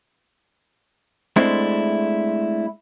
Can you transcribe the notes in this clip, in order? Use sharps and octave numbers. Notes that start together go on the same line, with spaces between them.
G#3 A3 C4 D4 E4